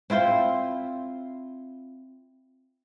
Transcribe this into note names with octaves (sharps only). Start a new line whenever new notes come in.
C4 E4 F4 C5